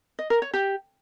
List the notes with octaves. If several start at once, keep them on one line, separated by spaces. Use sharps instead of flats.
D#5
A#4
C#5
G4